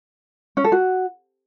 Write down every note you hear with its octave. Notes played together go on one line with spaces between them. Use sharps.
C#4
A4
F#4